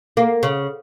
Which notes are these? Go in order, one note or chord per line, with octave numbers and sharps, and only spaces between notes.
A#3
C#3